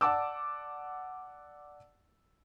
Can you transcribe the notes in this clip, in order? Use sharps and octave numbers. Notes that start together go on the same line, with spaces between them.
D5 F#5 A5 D6 E6